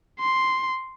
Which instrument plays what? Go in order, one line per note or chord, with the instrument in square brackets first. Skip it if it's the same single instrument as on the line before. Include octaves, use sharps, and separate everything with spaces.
[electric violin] C6